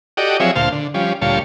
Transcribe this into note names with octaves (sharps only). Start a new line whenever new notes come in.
F#4 G4 A4 D5 D#5
F3 F#3 C4 G#4 C#5 E5
D2 A#2 C5 F5 A5
D3
F3 G3 C#4
D2 A#2 G3 F4 C#5 A5